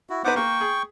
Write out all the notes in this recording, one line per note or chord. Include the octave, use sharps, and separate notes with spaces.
E4 F#4
B3 D#4 B4 C5 F#5 D6
A#3 G5 C#6
G#4